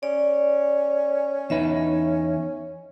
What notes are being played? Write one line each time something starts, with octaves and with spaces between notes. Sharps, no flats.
C#4 D5
E2 D#4 B4 E5